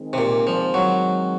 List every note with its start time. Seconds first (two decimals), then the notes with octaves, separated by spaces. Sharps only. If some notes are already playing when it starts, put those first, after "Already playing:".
Already playing: D#3 G#3 C4
0.13 C3
0.18 A#2
0.47 F3
0.74 F#3